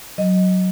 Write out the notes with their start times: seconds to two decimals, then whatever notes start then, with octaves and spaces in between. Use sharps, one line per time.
0.18 F#3 D#5